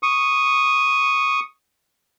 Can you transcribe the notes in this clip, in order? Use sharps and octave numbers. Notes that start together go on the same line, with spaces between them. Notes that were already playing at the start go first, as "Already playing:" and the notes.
C#6 D#6